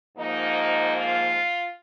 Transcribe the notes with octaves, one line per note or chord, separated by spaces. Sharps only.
G#2 F3 A#3 D#4
F4